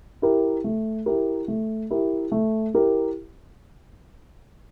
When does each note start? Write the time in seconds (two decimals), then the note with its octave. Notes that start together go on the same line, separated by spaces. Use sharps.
0.22 E4 G4 A#4
0.64 A3
1.06 E4 G4 A#4
1.48 A3
1.90 E4 G4 A#4
2.32 A3
2.74 E4 G4 A#4